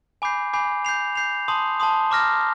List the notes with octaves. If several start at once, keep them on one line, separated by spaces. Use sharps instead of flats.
G#5 B5 D6 G6 C7
G#5 B5 D6 G6 C7
G6 C7 F7
G6 C7 F7
A5 C6 D#6
A5 C6 D#6
A#5 D6 F6 A#6